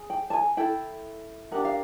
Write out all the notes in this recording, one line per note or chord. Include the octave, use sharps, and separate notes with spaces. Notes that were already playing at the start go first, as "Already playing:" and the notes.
Already playing: G#4
G5
A5
G#5
E4 A4 G5
D4 G4 A#4 F#5
F5